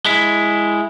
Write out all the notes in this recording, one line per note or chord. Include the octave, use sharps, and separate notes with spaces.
G#3 E4